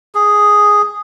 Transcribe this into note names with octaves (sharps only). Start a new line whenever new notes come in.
G#4